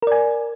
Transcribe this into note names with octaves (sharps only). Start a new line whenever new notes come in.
A#4 D5 G#5